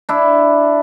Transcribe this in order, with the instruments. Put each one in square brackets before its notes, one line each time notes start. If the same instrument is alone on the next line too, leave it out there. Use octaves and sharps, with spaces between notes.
[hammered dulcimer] D4 E4